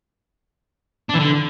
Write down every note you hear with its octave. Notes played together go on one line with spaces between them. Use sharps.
D4
E3
D3